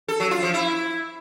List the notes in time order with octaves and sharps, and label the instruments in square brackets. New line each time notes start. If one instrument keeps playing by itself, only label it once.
[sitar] A4
F#3
F4
F3
E4